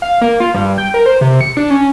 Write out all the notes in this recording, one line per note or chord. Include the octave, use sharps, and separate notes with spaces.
F5
A#3
F4
G2
G5
A#4
C5
C3
C#7
D4
C#4